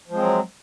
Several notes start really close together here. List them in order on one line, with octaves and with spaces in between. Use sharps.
F3 G#3 C4 F#3